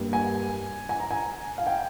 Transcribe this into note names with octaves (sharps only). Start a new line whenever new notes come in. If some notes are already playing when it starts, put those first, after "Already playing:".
Already playing: G2 G3 A#3
G#5
G#5
A#5
G#5
F5
G5